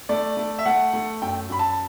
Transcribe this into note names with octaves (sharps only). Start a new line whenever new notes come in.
A3 D5
A3
E5
A3 F#5
A3
F#2 G5
F#2 B5
A5